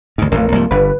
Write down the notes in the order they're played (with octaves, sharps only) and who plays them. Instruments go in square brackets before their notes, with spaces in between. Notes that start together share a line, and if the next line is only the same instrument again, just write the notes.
[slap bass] D2 G#2
[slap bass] A1 F2 [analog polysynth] A#3
[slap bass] C2 G#2 F3
[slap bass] G1 G2 [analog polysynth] B4